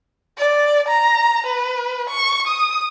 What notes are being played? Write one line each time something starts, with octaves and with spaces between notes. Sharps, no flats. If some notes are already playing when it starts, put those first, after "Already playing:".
D5
A#5
B4
C#6
D#6